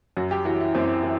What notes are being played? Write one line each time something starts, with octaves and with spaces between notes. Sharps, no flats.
F#2 F#4
G4
E3 F#4
E4
F#2 C4
E3